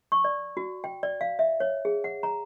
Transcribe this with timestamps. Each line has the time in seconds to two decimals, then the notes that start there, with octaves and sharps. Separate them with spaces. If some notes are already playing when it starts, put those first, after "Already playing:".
0.12 C#6
0.24 D5
0.57 F#4
0.84 G5
1.03 D5
1.21 F5
1.39 E5
1.60 C#5
1.85 G#4
2.04 F#5
2.23 A#5